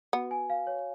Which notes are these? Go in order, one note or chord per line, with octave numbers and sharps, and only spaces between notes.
B3 F#4
G#5
F5
C#5